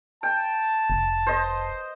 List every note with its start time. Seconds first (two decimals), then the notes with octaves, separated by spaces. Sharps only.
0.23 G5 A5
0.90 F1
1.27 C5 D#5